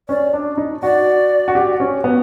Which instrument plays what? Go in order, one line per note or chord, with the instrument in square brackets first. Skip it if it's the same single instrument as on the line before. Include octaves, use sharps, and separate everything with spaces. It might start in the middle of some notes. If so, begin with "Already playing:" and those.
[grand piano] C#4 [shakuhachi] D5
[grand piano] D4
D#4
[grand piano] F#4 [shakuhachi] D5
[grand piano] F#4
G4
C#4
B3